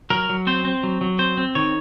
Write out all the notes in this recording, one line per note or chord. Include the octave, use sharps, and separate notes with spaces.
F#3 A#4
F#3
C4 C5
C4
F#3
F#3
C4 C5
C4
D#3 C#5